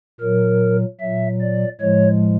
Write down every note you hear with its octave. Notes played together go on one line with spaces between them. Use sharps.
A#2 F#3 A#4
A#2 F#3 E5
D5
A2 F3 G#3 C#5